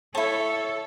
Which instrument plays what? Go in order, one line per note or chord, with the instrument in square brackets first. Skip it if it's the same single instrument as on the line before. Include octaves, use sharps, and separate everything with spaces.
[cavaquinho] E4 A5 [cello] A4 [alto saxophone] C#5